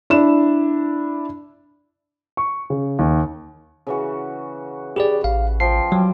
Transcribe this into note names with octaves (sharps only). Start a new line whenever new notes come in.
D4 E4 E7
C#6
C#3
D#2
C#3 E3 F#4
G4 G#4 D5 B5
A1 F5
F3 F5 G5 C7
F#3 G3